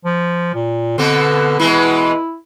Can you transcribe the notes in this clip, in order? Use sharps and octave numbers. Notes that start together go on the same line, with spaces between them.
F3
A#2
B2 D3 B3 C4
B2 E3 G#3 E4